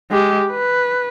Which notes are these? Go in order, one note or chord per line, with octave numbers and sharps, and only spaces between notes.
G#3 G4
B4